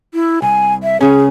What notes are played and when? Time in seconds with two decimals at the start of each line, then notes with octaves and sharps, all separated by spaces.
0.14 E4
0.42 C2 G#5
0.83 E5
1.01 C#2 C#3 C#4 G#4